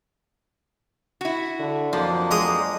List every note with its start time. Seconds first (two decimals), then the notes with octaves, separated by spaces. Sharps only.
1.21 E4 F#4
1.59 D3
1.93 F2 F3 F#3 A#3 D4
2.31 G#3 A#5 D#6